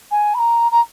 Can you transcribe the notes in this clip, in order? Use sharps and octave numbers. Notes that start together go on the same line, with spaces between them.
G#5
B5
A#5
A#5